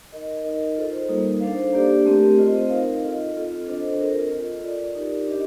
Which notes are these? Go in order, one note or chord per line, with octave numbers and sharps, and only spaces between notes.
D#4 A#4 D#5
D#4 A#4 D#5
F4 A4 C5
G3 A#3 D#4 A#4
D4 A4 C5 F5
A#3 D4 G4 D5
A3 C4 G4 A#4
C4 F4 C5 D#5
C4 D#4 A#4 F5
F4 A4 D#5
C4 F4 A4
D4 A4 C5 D#5
C4 F4 A#4
F4 A4 D#5
F4 A#4 D5
D#4 G4 A#4 D5
D4 G4 A#4 D#5